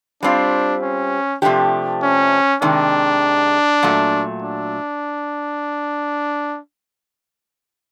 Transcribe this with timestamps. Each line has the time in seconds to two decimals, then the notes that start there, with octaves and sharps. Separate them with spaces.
0.22 G3 C4 D4 F4
0.82 C#4
1.42 C3 F3 A3 D4 G4
2.02 C#4
2.62 C3 D#3 G#3 D4
3.83 A#2 F#3 A3
4.42 D4